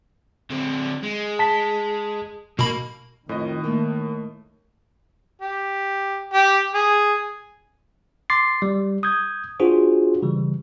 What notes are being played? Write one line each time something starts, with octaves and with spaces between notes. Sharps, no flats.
D3 C4
G#3
A5 B6
B2 A#3 B5
F2 A2 D#3 D#5
A3 A#3
G4
G4
G#4
C6 D6 A6 C7
G3
D#6 G6 G#6
D4 F4 F#4 G#4 C5
C#3 E3 G3